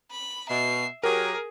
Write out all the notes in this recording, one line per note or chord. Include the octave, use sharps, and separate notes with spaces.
B5
B2 E5 C7
F#3 G4 G#4 A#4